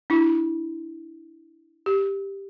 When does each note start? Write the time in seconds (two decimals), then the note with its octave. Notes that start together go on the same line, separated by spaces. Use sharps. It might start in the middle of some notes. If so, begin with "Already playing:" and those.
0.10 D4 E4
1.86 G4